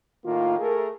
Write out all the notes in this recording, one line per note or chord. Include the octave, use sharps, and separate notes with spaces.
A2 D#3 A#3 F4
A3 G#4 A#4